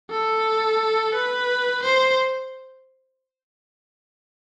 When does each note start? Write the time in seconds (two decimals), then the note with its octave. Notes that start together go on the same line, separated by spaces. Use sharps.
0.10 A4
1.14 B4
1.83 C5